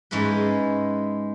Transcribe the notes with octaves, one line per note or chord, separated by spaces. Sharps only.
G#2 G#3 C#4 E4 B4